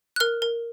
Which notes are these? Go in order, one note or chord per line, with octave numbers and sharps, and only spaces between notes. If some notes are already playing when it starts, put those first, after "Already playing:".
F#6
A#4 F6
A#4